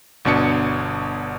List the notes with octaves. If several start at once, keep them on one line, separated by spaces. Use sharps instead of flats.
G1 B2 D4 C#7